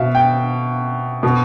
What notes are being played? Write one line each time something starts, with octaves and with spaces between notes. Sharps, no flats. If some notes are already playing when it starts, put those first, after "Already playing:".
Already playing: B2 E5 F5
G5
B2